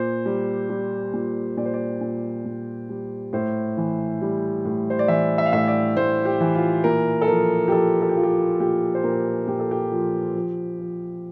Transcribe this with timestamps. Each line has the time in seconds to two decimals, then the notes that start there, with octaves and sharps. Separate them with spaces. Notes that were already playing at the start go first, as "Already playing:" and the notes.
Already playing: A#2 C5
0.26 G3
0.70 G3
1.13 A#2
1.57 A#2 D5
1.66 C5
1.74 D5
2.01 A#2
2.46 A#2
2.89 G3
3.33 A2 C5
3.77 E3
4.22 G3
4.65 A2
4.90 C5
4.99 D5
5.08 E3 E5
5.38 E5
5.46 F5
5.53 A2 E5
5.68 D5
5.96 A2 C5
6.25 G4
6.40 E3
6.55 F4
6.84 A#2 A#4
7.22 A4
7.28 F3 A#4
7.68 G4
7.72 F3 A4
8.02 A4
8.09 G4
8.16 F3 F4
8.23 G4
8.60 A#2 G4
8.95 C5
9.04 A#2 A#4
9.48 A#2 G4
9.60 A4
9.71 G4
9.92 F3
10.35 F3
10.79 F3